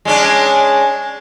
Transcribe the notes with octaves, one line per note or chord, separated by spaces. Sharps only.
G#3 C#4 D4